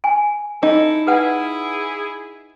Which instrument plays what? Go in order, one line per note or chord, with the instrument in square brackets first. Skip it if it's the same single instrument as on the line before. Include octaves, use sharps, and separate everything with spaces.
[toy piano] G#5
[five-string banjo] D#4 [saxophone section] E4 A4
[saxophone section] E4 G#4 [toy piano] B4 F#5